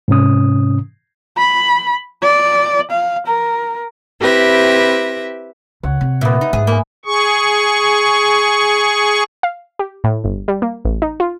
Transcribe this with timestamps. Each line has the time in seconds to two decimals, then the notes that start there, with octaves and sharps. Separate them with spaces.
0.08 G#2 C3 C#4 D#6
1.38 B5
2.23 D5
2.91 F5
3.27 A#4
4.21 C4 E4 G4 B4 E5 A#6
5.83 C#2 C#5 F#5
6.01 C3
6.21 D#2 A#2 B3 E5
6.41 D#4
6.53 G#2 G#4
6.67 A#3 G#5 B5
7.05 G#4 C#6
9.43 F5
9.79 G4
10.04 A2
10.24 G1
10.48 G3
10.62 A#3
10.85 A1
11.02 D#4
11.20 F4